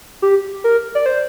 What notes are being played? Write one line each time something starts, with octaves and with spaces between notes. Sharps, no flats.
G4
A#4
D5
C5